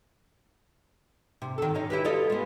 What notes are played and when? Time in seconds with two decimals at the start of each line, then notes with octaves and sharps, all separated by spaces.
1.42 C3
1.58 D#3 A4
1.75 C#4 D#4
1.90 E4 G4 B4
2.05 F4 A4 D#5
2.30 G#3 B3